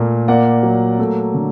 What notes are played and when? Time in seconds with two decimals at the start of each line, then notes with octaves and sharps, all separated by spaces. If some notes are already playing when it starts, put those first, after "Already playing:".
Already playing: A#2 A3 A#3
0.28 A#3 D5 F#5
0.63 F#3
0.99 A3
1.34 D3